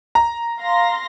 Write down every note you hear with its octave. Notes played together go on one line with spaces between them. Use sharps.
A#5
F5 C6 A#6